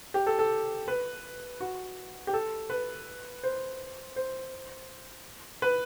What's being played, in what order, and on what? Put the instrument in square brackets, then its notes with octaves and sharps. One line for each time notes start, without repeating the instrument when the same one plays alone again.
[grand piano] G4
A4
A4
B4
F#4
G4
A4
B4
C5
C5
B4